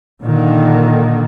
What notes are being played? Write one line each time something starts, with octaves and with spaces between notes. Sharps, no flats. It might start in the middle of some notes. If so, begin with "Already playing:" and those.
A#2 D3 D#3